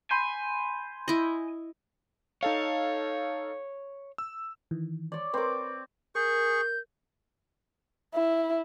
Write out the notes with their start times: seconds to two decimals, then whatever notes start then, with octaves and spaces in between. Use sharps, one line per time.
0.11 G#5 B5 C6 G6
1.08 E4 D#5
2.43 D#4 A4 C#5 F5
4.18 E6
4.71 D#3 E3
5.12 C#5 D5
5.34 C4 A#4 B4 D6
6.15 G#4 A#4 C#6 G6
8.14 E4